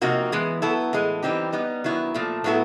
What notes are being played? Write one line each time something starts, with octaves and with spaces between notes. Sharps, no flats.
C3 F3 A#3 D#4 F#4
E3 G#3 B3 E4
F#3 B3 E4 A4
A2 E3 G#3
E3 G3 C4 D#4 G4
G3 B3 D#4
D#3 F#3 B3 E4
A#2 F3 A3
A2 F#3 B3 E4 A4